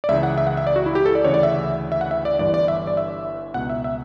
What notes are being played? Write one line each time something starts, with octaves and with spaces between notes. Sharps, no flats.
D5
C#2 C#3 E3 E5
F#5
E5
F#5
E5
D5
F#4
E4
G4
A4
D5
D2 C#3 E3 C#5
D5
E5
E5
F#5
E5
D5
G1 G2 E3 D5
D5
E5
D5
E5
C#2 B2 F#5
E5
E5